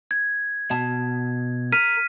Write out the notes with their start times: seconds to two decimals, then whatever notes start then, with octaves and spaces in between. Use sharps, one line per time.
0.11 G#6
0.71 B2 A5
1.72 A#4 F6 B6 D#7